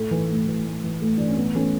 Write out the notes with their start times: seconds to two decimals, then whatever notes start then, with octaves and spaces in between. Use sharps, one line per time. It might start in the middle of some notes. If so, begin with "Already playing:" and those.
Already playing: A2 A3
0.11 E3
0.30 A2
0.47 E3
0.65 A2
0.84 E3
1.02 A2 A3
1.17 E3 D4
1.28 C#4
1.37 A2 B3
1.55 E3 A3 C#4